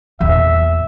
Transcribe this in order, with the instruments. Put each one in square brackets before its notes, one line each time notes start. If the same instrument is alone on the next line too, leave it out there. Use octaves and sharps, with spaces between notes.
[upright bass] E2 A#2 [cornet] E5